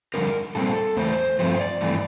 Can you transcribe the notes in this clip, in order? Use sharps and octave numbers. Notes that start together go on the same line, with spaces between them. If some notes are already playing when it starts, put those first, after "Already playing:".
F2 D3 G3 D4 A#4
A#2 G3 C4 A4
E2 E3 A3 C5
G2 F3 A3 C4 C5
D5
G2 E3 A3 C4